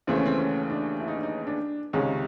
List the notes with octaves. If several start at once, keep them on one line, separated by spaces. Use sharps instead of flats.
D#2 C#3 E3 A3 C4
C#4
C4
C#4
D4
E4
D#4
D4
D#4
D4
C#2 C3 D#3 G#3 C#4